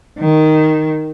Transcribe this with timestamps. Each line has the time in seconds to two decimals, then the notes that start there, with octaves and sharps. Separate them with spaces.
0.19 D#3